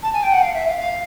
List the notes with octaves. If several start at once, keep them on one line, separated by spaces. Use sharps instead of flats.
A5
G#5
G5
F#5
F5
E5
F5
F5